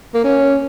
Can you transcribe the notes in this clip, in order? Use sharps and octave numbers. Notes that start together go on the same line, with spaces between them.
A#3
C#4